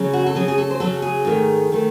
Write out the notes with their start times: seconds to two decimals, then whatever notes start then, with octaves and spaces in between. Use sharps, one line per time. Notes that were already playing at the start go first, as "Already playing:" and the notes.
Already playing: C#3 F#3 C#4
0.13 F#4
0.26 A4
0.35 C#3 F#3 C#4 G#4
0.48 G#4
0.58 A4
0.70 C5
0.80 C#3 F#3 C#4 A4
1.02 G#4
1.25 G#2 D#3 A3
1.72 D#3 A3